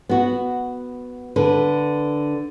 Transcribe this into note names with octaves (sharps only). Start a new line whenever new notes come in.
B3 F#4
D3 B4